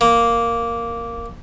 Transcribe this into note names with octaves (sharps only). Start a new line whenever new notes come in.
A#3